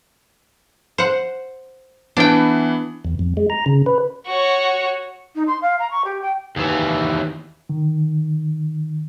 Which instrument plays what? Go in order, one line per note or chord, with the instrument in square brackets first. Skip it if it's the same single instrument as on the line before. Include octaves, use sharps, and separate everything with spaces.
[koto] C5 F#5
[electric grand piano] E3 B3 [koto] D4 G5
[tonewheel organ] E2
F2
G#3
A#5
C#3
B4
[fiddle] F#4 C#5
[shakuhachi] D#4
C6
F5
A#5
C#6
G4
G5
[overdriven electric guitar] D#2 E3
[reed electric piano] D#3